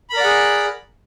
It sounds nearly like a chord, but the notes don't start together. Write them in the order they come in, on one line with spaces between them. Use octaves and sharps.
B5 A#4 D5 F#5 G#4